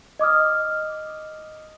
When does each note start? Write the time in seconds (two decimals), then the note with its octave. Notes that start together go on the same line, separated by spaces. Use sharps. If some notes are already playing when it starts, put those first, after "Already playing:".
0.19 D#5 D6 D#6 F6